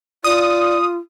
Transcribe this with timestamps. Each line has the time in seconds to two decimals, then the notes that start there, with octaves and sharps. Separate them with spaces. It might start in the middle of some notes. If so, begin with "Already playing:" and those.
0.24 F4 D5 D#6